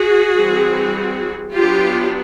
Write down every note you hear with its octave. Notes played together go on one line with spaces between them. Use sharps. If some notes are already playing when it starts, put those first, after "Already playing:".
Already playing: F#4 G#4
E3 G3 C4
F#3 B3 D4 F4 G4